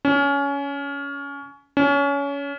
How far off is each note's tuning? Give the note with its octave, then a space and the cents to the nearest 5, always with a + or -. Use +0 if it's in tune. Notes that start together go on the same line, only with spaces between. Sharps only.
C#4 +20
C#4 +25